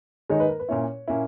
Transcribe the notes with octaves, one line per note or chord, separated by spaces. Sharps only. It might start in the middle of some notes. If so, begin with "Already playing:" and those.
D#3 G#3 D#4 C#5
B4
A#4
B4
A#2 A#3 C#4 E4 C#5
A#2 A#3 C#4 E4